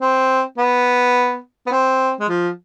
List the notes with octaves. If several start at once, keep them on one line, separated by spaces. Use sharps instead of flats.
C4
B3
B3
C4
G#3
F3